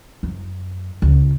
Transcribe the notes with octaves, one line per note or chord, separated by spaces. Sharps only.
F#2
C#2